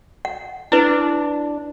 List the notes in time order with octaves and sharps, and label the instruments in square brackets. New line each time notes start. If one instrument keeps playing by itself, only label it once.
[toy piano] F#5
[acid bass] D4 [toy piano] E4 B4